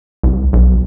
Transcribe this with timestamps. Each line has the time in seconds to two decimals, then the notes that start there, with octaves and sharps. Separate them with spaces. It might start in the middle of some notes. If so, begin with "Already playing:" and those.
0.23 C2
0.53 B1